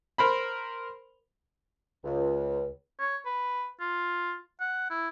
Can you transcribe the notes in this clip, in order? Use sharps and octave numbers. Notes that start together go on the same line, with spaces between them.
A#4 C5 B5
C#2
C#5
B4
F4
F#5
E4